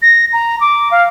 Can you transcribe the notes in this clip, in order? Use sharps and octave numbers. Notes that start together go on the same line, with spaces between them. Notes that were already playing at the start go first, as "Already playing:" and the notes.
A#6
A#5
D6
F5